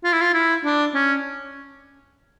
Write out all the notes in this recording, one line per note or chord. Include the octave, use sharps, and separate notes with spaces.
F4
E4
F4
E4
D4
C#4